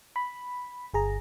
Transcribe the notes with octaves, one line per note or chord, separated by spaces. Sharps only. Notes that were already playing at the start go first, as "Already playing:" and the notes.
B5
G1 G#4 A#5